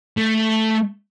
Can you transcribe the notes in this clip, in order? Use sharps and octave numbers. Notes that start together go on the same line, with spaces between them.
A3